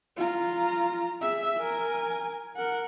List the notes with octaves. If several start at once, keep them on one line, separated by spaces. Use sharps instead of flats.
F4 A#5
G#4 E5
A#4 G#5
A#4 F#5